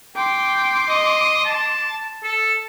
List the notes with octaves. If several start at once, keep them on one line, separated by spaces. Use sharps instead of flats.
G5 C6 D6
D#5
A5
A4